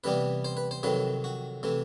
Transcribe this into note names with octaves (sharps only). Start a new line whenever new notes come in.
C3 E3 G3 B3 B4
C5
B4
C5
F2 C3 D#3 F#3 B4
F#4
C3 E3 A3